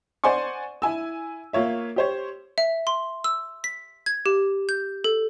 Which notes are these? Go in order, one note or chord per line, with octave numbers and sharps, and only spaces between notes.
C5 D5 F#5 G#5 C6 C#6
E4 G#5 E6
A#3 F4 C#5 E5
G4 C5 C#5
E5
C6
E6
B6
G#6
G4
G6
A4